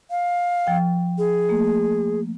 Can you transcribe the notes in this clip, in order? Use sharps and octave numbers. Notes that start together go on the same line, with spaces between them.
F5
F3 G5
G#4
A3 A#3